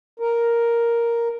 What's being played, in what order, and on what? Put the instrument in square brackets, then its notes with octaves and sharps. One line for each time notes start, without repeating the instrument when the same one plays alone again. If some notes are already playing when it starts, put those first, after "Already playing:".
[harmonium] A#4